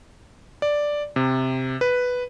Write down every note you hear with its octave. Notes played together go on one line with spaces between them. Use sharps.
D5
C3
B4